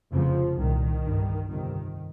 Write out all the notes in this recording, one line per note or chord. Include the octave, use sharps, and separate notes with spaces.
F1 F2 C#3 F3
C2 A#2 D#3
G1 G2
G1 F2 C3 D#3